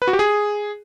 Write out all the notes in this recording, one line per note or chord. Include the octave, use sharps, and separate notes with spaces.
B4
F#4
G4
G#4